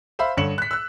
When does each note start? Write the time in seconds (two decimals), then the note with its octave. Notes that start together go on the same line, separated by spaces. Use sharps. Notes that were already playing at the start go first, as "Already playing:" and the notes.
0.19 C5 E5 F5 B5
0.37 G2 D3 C#5 C#7 E7 F#7
0.58 F#6 B6
0.71 E6 F#6